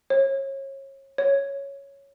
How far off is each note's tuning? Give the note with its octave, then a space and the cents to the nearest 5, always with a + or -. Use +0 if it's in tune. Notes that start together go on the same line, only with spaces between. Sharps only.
C#5 -30
C#5 +0